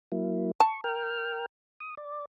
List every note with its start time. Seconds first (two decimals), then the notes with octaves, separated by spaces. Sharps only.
0.12 F#3 A#3 E4
0.60 A5 C#6
0.84 A#4 G5 F6
1.80 D#6
1.97 D5